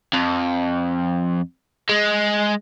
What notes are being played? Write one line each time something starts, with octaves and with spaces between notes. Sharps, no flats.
F2
G#3